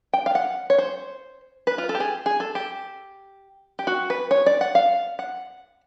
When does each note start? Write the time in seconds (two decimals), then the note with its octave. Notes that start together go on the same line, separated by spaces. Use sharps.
0.13 G5
0.26 F5
0.35 F#5
0.70 C#5
0.78 C5
1.67 B4
1.78 F4
1.89 A4
1.95 G4
2.00 G#4
2.26 G#4
2.40 A4
2.55 G4
3.79 G4
3.87 F#4
4.10 B4
4.31 C#5
4.46 D5
4.61 F#5
4.75 F5
5.19 F#5